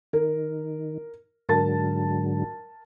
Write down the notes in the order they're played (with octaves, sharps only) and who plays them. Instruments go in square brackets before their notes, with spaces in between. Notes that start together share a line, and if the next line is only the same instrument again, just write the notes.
[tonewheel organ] D#3 [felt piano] A#4
[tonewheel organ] G#2 D3 F#3 [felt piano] A#4 A5 A6